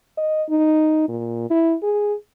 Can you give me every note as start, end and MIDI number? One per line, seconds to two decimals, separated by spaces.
0.17 0.43 75
0.49 1.04 63
1.09 1.49 46
1.50 1.75 64
1.83 2.14 68